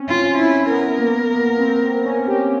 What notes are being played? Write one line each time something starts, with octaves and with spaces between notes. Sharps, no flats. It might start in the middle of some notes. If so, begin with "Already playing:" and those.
Already playing: C4 C#4
F4
E4
B3 A#4
A#3
B3
C4
C4
C#4
G4